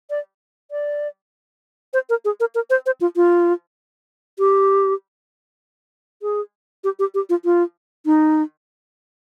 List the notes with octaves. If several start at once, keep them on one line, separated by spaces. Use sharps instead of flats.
D5
D5
C5
A#4
G#4
A#4
A#4
C5
C5
F4
F4
G4
G#4
G4
G4
G4
F4
F4
D#4